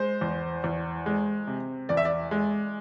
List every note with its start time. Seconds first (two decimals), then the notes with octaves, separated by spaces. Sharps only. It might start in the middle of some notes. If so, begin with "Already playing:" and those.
Already playing: G#3 C5
0.21 E2
0.64 E2
1.06 G#3
1.47 C3
1.89 E2 D5
1.97 E5
2.05 D5
2.31 G#3